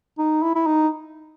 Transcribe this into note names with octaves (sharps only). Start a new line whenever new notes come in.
D#4
E4
E4
D#4